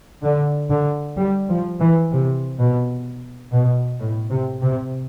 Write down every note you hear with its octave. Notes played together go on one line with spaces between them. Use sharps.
D3
D3
G3
F3
E3
C3
B2
B2
A2
C3
C3